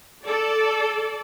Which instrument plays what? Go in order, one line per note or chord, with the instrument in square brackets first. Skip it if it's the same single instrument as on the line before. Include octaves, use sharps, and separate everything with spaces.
[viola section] A4 D5